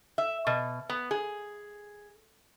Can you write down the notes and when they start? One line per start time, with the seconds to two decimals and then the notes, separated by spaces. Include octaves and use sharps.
0.18 E5
0.47 B2
0.90 B3
1.11 G#4